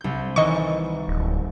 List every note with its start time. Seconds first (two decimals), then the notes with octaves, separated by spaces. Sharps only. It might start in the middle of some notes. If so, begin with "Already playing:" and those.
0.01 C2 G6
0.36 D#3 E3 D#5 C#6
1.08 D1